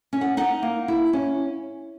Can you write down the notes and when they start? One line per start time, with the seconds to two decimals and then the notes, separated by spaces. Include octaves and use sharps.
0.13 C#4
0.21 F#5
0.37 D#4 F#5
0.62 A#3
0.88 E4
1.13 C#4